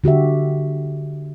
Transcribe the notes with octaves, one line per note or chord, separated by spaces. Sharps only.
D3 F#4 G4 E5